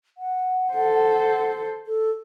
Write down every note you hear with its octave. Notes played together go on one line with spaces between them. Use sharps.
F#5
A4 C5
A4